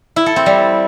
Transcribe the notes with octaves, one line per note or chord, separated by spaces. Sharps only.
E4
A4
C4
G3